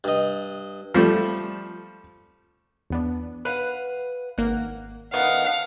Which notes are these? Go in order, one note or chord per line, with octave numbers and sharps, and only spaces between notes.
G2 D#5
F3 G3 A3
E2 B3 D4
B4 F5 F#5
G#1 A#3 F#5
D#3 A3 B3 F5 F#5